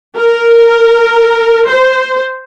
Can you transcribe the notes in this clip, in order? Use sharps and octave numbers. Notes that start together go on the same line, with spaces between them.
A#4
C5